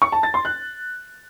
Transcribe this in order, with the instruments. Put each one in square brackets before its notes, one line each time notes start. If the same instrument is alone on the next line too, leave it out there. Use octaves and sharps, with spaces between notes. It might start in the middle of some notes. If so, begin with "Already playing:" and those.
[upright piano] C#6
A5
A6
C6
F#6